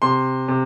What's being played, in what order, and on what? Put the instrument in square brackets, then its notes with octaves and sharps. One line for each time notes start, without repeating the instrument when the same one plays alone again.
[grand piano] C3 C6
C3